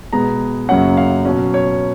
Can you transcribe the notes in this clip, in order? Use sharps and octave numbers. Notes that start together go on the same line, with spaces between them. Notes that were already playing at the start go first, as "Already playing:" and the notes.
B2 G#3 B3 A#5
F#2 C#3 F#3 A#3 C#4 F#5
F5
B2 F#3 C#4
C#5